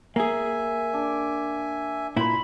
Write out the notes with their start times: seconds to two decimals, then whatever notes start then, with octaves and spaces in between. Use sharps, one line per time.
0.16 A#3 G#4 E5 G#5
0.93 D4
2.16 A#2 E4 B5 C6